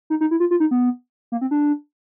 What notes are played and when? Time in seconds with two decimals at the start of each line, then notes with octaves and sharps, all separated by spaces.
0.10 D#4
0.21 D#4
0.31 E4
0.40 F4
0.51 F4
0.60 D#4
0.71 B3
1.32 A#3
1.41 C4
1.51 D4